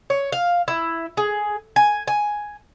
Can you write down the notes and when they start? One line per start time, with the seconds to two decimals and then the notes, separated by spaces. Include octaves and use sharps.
0.10 C#5
0.32 F5
0.68 E4
1.17 G#4
1.76 G#5
2.08 G#5